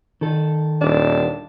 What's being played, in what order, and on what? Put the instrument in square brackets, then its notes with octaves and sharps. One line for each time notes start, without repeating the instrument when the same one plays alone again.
[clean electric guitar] D#3 A4
[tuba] D#1 [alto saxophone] D4